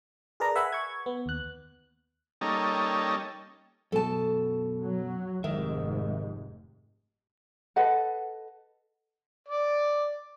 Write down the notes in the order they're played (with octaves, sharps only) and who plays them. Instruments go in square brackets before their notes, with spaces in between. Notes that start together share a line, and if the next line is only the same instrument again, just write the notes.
[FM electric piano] G#4 A#4 B4 D5 A5 A#5
B4 E5 F#5 G#5 B5
C#6 G#6
B3
D#2 F#6
[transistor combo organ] G3 A#3 C#4 D#4 A4
[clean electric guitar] F#2 B2 [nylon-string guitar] A4 A5
[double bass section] F#3
[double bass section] F1 G#2 C3 [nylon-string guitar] D#3 [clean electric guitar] E5
[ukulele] A4 B4 D#5 F#5
[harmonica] D5